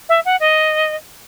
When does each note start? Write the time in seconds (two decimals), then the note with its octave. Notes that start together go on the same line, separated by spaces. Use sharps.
0.09 E5
0.25 F#5
0.40 D#5